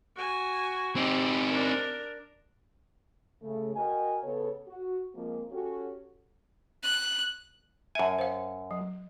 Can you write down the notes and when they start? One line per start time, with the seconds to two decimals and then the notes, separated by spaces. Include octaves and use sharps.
0.16 F#4 G#5
0.96 C4 D#4 G4
1.50 D4 A#4
3.42 C#3 A3
3.76 F#4 A#4 D#5 G5 G#5
4.23 C#3 B3 A4 C#5
4.67 F#4
5.15 F3 G#3 A#3 C4
5.52 C#4 F#4 G4 A4
6.83 F#6
7.95 F#2 E5 G#5 A5
8.19 C5 F5
8.71 F#3